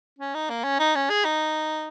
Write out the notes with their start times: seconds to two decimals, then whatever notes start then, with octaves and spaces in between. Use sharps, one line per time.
0.19 C#4
0.34 D#4
0.50 A#3
0.64 C#4
0.79 D#4
0.95 C#4
1.10 G#4
1.25 D#4